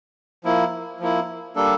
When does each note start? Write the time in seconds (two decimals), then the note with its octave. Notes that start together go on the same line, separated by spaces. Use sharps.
0.44 F3 A#3 E4
1.00 F3 A#3 E4
1.56 G3 A#3 D4 A4